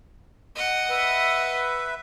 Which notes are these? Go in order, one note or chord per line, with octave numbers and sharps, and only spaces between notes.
D#5 F#5
B4 E5